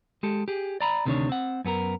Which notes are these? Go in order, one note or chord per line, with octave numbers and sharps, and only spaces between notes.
G#3 G4 A4
G4 G#4
D5 A#5 B5
D2 C3 D#3 A3 D4 C#5
C4 F#5
F#2 B3 G#4 A#4